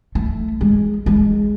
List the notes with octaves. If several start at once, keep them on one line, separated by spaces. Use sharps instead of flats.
A3
G#3
G#3